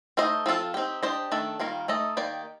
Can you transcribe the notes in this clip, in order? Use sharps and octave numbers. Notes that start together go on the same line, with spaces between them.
A3 D#4 A4 C5 D#5
F3 C4 F4 A4
C4 D#4 G4
D4 G4 C5 D#5
D#3 A3 D4 A4
D#3 G3 A#3 F4 A#4
A3 D#4 A4 D#5
D#3 A#3 D#4 G4 D5